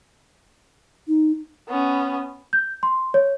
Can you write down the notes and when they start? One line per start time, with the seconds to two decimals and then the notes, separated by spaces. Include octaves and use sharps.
1.08 D#4
1.69 B3 C#4
2.53 G6
2.83 C6
3.14 C#5